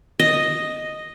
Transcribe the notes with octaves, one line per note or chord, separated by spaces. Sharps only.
D#5